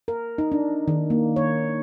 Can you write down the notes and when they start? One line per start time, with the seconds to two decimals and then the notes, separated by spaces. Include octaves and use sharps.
0.08 A#4
0.38 D#4
0.52 D4
0.88 D#3
1.10 A#3
1.36 C#5